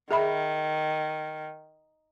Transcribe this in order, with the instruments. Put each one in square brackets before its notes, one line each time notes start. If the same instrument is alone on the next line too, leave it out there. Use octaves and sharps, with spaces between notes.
[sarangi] D#3 [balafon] G#4 E5 B5